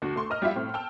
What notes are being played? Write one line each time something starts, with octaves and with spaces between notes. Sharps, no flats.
D2 F#4
A3 C6 C#6
A#4 D#5 F6
G3 E4 F4 E5
A2 C4
G5 A5 E6 F6